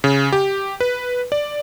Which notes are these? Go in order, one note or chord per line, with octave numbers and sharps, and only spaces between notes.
C#3
G4
B4
D5